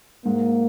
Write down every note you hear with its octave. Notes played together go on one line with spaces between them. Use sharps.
G#2 A#3